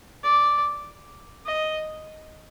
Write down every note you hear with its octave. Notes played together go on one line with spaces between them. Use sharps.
D5
D#5